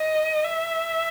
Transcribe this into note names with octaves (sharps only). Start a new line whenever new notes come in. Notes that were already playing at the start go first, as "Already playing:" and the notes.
Already playing: D#5
E5